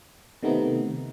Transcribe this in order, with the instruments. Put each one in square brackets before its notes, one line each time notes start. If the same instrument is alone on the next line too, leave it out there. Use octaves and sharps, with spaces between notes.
[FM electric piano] C3 D#3 A3 B3 D#4